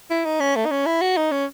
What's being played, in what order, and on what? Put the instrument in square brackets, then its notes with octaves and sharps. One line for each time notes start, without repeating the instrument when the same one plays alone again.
[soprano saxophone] E4
D#4
C#4
A3
D#4
C#4
E4
F#4
D#4
C#4